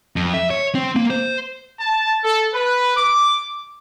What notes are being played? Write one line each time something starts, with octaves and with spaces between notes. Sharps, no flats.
F2
E5
C#5
C4
A#3
C5
A5
A4
B4
D6